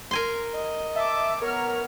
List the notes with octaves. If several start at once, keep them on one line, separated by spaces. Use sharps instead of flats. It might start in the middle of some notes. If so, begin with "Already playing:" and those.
A#4 G#5 C6
D#5
E5 A5 D6
B3 A#4 C#5 F6